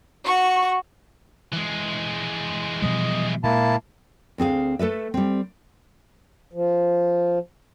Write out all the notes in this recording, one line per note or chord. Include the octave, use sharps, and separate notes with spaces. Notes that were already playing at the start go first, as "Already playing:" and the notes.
F#4 C#6
E3 G#3
B2 F3 G3 D#5
A#2 G#3 A#3 E4 A5
D2 C4 G#4 F5
A3 A4 B4 E5
G3 C4
F3